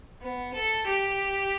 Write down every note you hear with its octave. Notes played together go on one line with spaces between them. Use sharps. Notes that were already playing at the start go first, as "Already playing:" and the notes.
B3
A4
G4